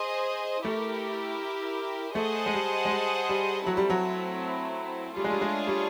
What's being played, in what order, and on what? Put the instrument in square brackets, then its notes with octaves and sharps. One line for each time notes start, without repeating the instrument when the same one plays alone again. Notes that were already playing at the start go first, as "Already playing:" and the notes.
Already playing: [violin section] G#4 C5 D#5
[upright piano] A3 [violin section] E4 G4 A#4
[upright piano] A3 [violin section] G#4 C5 D#5 F#5 A5
[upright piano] G#3
G3
G#3
G3
G3
[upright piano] F#3 [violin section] A3 C4 E4
[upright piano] G3
F#3
[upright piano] G3 [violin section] A3 D4 F4 G#4 C#5
[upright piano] G#3
G3
G#3
G3